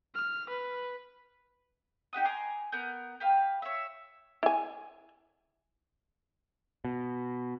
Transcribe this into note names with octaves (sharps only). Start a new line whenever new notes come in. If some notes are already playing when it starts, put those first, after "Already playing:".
F6
B4
D#4 G4 F#5 D#6
G#5 A#5 C6 D6
B3 A#4 G6
G4 B4 F5
C#5 E5
E4 G#5
B2